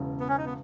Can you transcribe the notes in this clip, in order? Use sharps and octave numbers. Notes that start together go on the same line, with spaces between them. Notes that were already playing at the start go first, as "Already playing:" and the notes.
Already playing: E1 E2 C#3
B3
C#4
D#4
B3